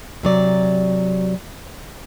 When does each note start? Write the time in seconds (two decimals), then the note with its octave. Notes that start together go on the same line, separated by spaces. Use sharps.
0.23 C3 F#3 D5